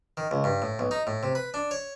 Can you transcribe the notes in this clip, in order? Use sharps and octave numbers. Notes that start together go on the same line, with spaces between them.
D#3
C#2
G2
A2
B1
D#4
A2
C3
B4
D4
C#5